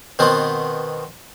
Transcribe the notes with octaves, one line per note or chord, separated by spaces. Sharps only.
B2 D#3 B3 C4